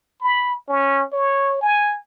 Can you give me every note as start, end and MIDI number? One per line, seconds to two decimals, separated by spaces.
0.21 0.54 83
0.68 1.04 61
1.13 1.59 73
1.61 1.98 80